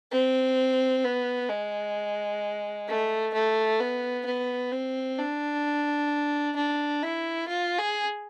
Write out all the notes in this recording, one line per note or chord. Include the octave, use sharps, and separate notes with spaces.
C4
B3
G#3
A3
A3
B3
B3
C4
D4
D4
E4
F4
G#4